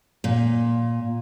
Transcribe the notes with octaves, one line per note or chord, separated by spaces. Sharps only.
A#2